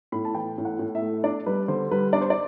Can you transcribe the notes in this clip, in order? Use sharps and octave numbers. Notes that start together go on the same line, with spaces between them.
A2 B5
A5
E3 G5
A2
F#5
A2
E5
A3
D4 D5
G3 B4
D3 C5
G3 B4
D4 D5
C5
D5